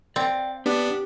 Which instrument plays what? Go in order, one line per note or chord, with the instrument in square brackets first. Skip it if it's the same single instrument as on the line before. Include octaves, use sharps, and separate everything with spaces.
[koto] C4 [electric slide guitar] D5 F5 G5
[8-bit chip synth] B3 D4 [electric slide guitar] G4